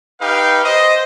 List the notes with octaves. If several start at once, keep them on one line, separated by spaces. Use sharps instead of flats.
D#4 G4 B4 F5 G5
C5 D#5